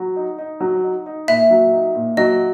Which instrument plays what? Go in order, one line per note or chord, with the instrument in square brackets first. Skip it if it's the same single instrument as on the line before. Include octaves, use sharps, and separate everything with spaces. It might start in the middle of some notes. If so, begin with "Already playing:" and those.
Already playing: [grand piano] F#3
D#4
D#4
F#3
D#4
D#4
[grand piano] A#2 [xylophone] E5
[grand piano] F#3
D#4
A#2
[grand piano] F#3 [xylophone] D#5